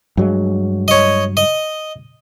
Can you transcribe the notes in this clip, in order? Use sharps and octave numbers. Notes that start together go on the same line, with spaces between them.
G2 F#3 G#3
C#5 D#5
D#5